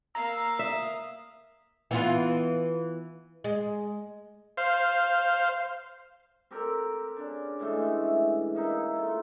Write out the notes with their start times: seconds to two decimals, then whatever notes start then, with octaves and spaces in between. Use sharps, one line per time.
0.15 A#3 F5 A#5 E6
0.59 E5 D#6
1.91 E3 B3 F4
3.44 G#3
4.57 C5 F5
6.51 C4 G4 A4 A#4
7.16 C#3 D4
7.59 A2 E3 G#3 A3
8.55 A#3 D#4 E4
8.96 A3 F4